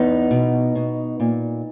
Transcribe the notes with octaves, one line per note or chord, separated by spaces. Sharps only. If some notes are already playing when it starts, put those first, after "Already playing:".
Already playing: E2 B3 D#4
B2
B2
A#2